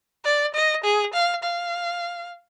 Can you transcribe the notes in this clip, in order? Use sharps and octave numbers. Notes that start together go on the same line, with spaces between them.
D5
D#5
G#4
F5
F5